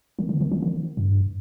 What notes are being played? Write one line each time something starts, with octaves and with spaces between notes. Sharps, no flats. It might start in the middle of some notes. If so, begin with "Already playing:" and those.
D#3
D3
D#3
F3
D#3
G2